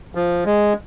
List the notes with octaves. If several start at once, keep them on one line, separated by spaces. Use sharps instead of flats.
F3
G#3